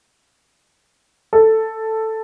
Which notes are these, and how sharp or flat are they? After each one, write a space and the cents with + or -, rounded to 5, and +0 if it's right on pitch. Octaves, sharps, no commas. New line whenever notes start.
A4 +5